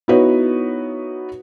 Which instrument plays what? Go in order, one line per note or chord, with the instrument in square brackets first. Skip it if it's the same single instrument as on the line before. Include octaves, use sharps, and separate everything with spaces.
[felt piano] B3 D#4 E4 F#4 B4 C#5